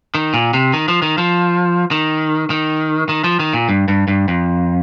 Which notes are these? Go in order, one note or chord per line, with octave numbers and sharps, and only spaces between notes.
D#3
A#2
C3
D#3
F3
D#3
F3
D#3
D#3
D#3
F3
D#3
A#2
G2
G2
G2
F2